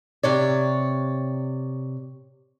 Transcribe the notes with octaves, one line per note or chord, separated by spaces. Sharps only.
C3 C#5 D5